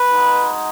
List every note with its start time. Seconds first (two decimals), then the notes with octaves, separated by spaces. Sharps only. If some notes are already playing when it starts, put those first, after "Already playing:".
Already playing: B4
0.08 G#3 D#4 F#4